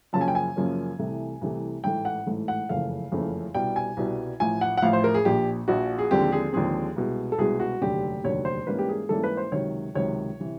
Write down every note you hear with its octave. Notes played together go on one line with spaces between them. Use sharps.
F#2 C#3 F3 A#3 C#4 A5
G#5
G5
G#5
F#2 C#3 F3 A#3 C#4
C2 C3 E3 A3
C2 C3 E3 A3
A1 G#2 E3 A3 G5
F#5
A1 G#2 E3 A3
F#5
F#1 F2 C#3 E3 A3 F5
F#1 F2 C#3 E3 A3
C2 B2 G3 G5
G#5
C2 B2 G3
A1 A2 F3 G#5
F#5
F#5
A1 A2 F3 F5
C5
A#4
G#4
A#1 A#2 F3 G4
A#1 A#2 F3 F#4
G#4
D#2 D3 F3 G#3 C4 G4
G#4
D#2 D3 F3 G#3 C4 G#4
C2 B2 G#3
A4
C2 B2 G#3 G#4
F#4
F1 D#2 D3 F#3 G4
F1 D#2 D3 F#3 C#5
C5
G#2 E3 G3 A#3 C#4 B4
G4
G#4
G#2 E3 G3 A#3 C#4 A4
B4
C5
C#2 C3 D#3 F#3 C#5
C#2 C3 D#3 F#3 C#5
C3 E3